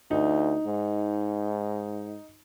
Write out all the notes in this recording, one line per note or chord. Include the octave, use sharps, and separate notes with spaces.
D2 D#4
G#2